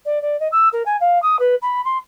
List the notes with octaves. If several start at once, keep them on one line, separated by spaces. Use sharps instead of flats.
D5
D5
D#5
E6
A#4
G#5
F5
D#6
B4
B5
C6